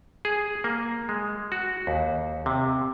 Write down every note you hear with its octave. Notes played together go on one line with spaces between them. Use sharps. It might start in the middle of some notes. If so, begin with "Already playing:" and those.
G#4
A#3
G#3
F#4
D#2
C3